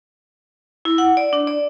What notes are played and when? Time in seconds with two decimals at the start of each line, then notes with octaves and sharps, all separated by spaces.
0.85 E4
0.98 F#5
1.17 D5
1.33 D4
1.47 D5